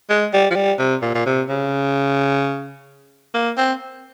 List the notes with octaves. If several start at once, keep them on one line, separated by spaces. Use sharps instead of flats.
G#3
G3
F3
G3
C3
A#2
A#2
C3
C#3
A#3
C4